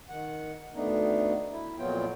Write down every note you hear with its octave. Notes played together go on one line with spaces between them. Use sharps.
D#3 F#5
D2 A3 B3 D4 D#4
E4
F2 A#2 F#3 B3 F4 G5